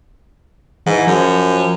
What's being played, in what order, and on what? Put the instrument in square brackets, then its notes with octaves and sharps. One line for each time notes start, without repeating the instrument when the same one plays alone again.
[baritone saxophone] G#2 [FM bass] E3
[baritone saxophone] F#2 [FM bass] F3